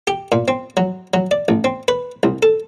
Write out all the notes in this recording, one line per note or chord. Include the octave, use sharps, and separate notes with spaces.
G4
A#2
C4
F#3
F#3
D5
A1
C4
B4
C2
A4